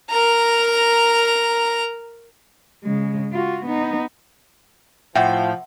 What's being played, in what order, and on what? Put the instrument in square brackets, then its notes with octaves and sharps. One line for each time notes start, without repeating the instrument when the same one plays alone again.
[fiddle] A#4 A#5
[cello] C#3 G#3
F4 F#4
B3 D#4
[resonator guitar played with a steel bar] A2 [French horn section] F3 [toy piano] E5 F#5 C6 [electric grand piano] G5